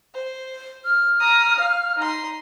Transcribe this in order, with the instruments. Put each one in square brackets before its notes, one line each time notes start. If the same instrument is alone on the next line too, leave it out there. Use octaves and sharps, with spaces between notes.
[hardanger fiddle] C5
[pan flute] F6
[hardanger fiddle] A#5 D#6
F5
D#4 C6